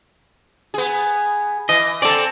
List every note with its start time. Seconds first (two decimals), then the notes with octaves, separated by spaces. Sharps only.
0.74 B3 G#4
1.69 E3 D#5
2.02 C4 A4 D5